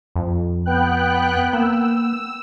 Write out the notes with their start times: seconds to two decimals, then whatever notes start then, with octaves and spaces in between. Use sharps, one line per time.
0.16 F2
0.66 B3 G5 F#6
1.53 A#3 E6